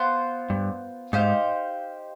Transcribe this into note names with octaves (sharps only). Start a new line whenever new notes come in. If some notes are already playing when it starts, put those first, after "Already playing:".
Already playing: B3 F4 C5
G2
G#2 D#4 G4 C5 F5